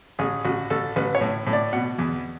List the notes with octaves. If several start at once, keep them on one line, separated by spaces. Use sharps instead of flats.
A1 G#4
A1 F#4
A1 A4
A1 B4
C#5
A2
A2
D5
B2 F#5
E2